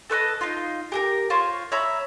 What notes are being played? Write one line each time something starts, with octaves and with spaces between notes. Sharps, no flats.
A4 B4 C#5 D#5
D#4 F4
G4 G#4 A#4
F4 C5 C#5
C#5 E5 A#5 B5